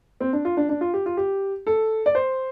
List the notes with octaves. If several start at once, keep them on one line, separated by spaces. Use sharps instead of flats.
C4
D4
F4
D4
D4
F4
G4
F4
G4
A4
D5
C5